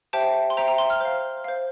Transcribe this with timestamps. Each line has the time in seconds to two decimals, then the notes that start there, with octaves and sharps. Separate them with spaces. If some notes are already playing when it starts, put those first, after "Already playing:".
0.13 G4 C5 E5 G5 A5
0.50 C6
0.57 C5 E5 G5 A#5
0.68 A#5
0.78 C6
0.90 F6
1.00 C5 F5
1.44 C5 F5